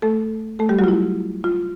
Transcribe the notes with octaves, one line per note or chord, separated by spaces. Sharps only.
A3 A4
A3 A4
G3 G4
F#3 F#4
F4
E4
F4